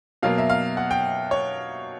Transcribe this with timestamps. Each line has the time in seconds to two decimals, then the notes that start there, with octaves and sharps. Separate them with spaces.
0.23 B2 F#3 A#3 F5
0.38 E5
0.50 F5
0.77 F#5
0.91 G5
1.31 C#5